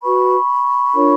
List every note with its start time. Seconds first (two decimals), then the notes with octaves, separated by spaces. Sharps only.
0.03 F#4 B4 B5 C#6
0.94 D4 F4 A#4 C#5